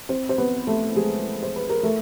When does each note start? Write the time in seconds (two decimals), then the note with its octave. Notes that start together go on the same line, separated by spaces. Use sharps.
0.09 C4 C5
0.29 C5
0.38 B3 B4
0.67 A3 A4
0.96 G#3 G#4
1.43 C5
1.56 B4
1.69 A#4
1.83 A3 A4